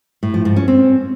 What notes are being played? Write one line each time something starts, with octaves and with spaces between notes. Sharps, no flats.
A2
F3
G#2
C#4
C4